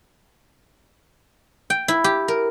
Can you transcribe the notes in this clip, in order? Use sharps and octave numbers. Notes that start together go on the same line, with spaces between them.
G5
E4
G4
A#4